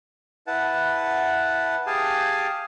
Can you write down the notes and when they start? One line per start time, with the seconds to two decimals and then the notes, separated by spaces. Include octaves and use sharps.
0.47 E4 B4 F#5 A5
1.86 G4 G#4 F5 G#5 A5